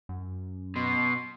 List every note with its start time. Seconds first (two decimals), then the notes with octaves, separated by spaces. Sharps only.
0.09 F#2
0.76 B2 C6